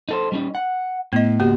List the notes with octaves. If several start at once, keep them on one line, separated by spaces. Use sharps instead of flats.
D#4 A4 C5
G3 C#4 D#4
F#5
A2 B3 D#5
C#2 G#2 A#3 F#4 G4